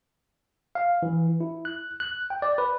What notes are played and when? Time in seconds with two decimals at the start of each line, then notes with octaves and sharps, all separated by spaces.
0.75 F5
1.03 E3
1.41 E4
1.65 F#6
2.00 F#6
2.30 G5
2.42 D5
2.58 B4